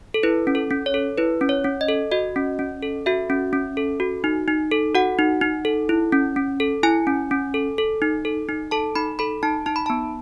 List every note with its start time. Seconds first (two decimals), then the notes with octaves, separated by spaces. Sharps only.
0.14 A4
0.23 E4 B4
0.47 C#4
0.55 A4
0.71 C#4
0.86 C#5
0.94 A4
1.17 E4 B4
1.41 C#4
1.49 C#5
1.64 C#4
1.81 D#5
1.89 A4
2.11 F#4 D#5
2.36 C#4
2.59 C#4
2.82 A4
3.06 F#4 E5
3.30 C#4
3.53 C#4
3.77 A4
4.00 F#4
4.24 D#4
4.48 D#4
4.71 A4
4.95 F#4 F#5
5.19 D#4
5.41 D#4
5.65 A4
5.89 E4
6.12 C#4
6.36 C#4
6.60 A4
6.83 E4 G#5
7.07 C#4
7.31 C#4
7.54 A4
7.78 A4
8.02 D#4
8.25 A4
8.49 D#4
8.71 A4 A5
8.95 D#4 B5
9.19 A4 B5
9.43 D#4 A5
9.66 D#4 A5
9.76 B5
9.86 B3 A5